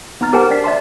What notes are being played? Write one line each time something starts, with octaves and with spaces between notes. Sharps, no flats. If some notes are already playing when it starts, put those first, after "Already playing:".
B3 D#4 A#5 F6 A6
G4 A#4 C5 F#5 G5 A5
D4 D5 G5 B6 C7
D5 E5 A5 C6